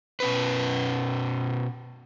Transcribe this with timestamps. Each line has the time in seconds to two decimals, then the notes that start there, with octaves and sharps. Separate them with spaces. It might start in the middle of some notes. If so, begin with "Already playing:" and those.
0.20 B2 C#4 B4